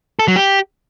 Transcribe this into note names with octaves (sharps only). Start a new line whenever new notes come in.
A4
F#3
G4